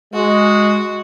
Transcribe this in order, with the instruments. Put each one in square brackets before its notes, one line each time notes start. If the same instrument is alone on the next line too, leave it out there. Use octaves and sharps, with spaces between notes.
[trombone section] G#3 [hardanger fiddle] F#4